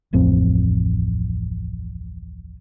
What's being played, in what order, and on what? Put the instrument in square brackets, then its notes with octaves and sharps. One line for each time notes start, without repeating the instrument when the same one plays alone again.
[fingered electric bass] D1 A1 F2 C4